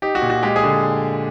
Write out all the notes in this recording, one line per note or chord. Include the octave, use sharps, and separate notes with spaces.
D#4 G4
F#4
A#2
F#4
G#3 G4
G#4
D3